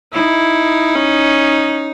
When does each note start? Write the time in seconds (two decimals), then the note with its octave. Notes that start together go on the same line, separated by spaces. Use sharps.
0.13 D#4 E4
0.95 C#4